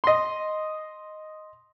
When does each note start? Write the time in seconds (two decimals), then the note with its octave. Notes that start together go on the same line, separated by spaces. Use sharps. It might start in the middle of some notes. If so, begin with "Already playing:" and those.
0.04 D#5 C6